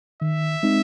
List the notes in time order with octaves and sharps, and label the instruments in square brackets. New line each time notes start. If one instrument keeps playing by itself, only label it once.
[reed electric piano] D#3 [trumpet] E5
[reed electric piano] G#3 C4 D#4